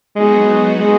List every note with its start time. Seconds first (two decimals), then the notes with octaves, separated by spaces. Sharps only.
0.16 F#3 G#3 B3 D#4 F#4
0.80 G#3